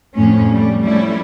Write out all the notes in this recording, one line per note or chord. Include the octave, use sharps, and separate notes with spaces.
F2 A2 C#4
G3 A3
F3 G3 A3 C#4 E4